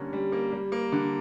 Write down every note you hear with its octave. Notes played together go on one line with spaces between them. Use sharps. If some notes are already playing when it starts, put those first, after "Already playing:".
Already playing: D3 G3 A#3 C#4
G3
A#3
G3
A#3
D3